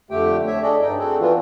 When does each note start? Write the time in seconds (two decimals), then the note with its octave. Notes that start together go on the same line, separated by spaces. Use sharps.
0.11 F2 D3 A3 G4 G5
0.47 C#5 E5
0.63 D4 G#4 A4 D5 D#5
0.82 G2 D#4 G5
0.98 C4 D4 F#4 G#4 A4
1.20 E3 B3 D4 F4